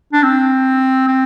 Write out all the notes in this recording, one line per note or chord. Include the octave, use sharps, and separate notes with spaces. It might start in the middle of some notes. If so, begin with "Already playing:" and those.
D4
C4
C4